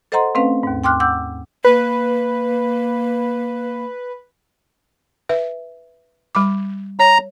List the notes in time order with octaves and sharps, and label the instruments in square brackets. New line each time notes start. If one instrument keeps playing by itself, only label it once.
[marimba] A4 C5 D#5 F#5 A#5 C6
A3 C4 C#4 B4 F5
D#2 G#2
G5 C6 D6 F6 F#6
F#5 D6 E6 G6
[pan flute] A#3 [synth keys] B4
[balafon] B4 E5
G3 B5 D6
[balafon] C#5 [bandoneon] A#5